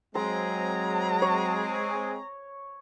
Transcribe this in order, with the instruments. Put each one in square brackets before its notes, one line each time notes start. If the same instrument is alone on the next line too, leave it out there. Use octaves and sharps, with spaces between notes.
[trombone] F#3 [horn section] G#3 C4 G#4 [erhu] A#5 [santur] C6
[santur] C#5